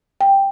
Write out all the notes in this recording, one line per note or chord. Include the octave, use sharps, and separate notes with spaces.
G5